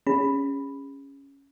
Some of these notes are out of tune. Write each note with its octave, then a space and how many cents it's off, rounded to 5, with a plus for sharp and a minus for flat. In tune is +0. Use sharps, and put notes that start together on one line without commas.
C#4 +0 G#4 -35 B5 +0